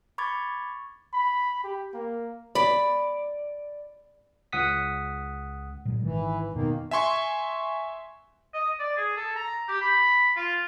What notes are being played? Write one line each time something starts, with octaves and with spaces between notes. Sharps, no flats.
B5 C#6 D6 G#6 A6
B5
G4
A#3
D5 B5
C#2 F#5 D#6 B6
A#2 F#3 G#3
G#1 D#3 E3
F1 B2 D#3 A#3
E5 G#5 C6 C#6
D#5
D5
G#4
A4
A#5
G4
B5
F4